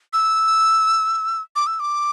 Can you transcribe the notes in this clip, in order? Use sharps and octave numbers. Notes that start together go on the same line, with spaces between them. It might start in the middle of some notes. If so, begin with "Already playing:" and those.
E6
D6
E6
D6